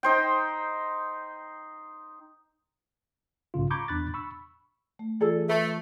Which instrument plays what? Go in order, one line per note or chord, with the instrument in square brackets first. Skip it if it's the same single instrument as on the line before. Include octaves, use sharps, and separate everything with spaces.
[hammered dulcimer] D#4 C5 G5
[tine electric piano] B1 G#2 C#3 F4
A#5 B5 C#6 D6 G6 G#6
E2 D4 B5 F#6 A6
B5 C#6 E6
[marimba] A3
[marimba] E3 F4 E6 [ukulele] G#4 A4 D5
[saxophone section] A3 [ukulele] B4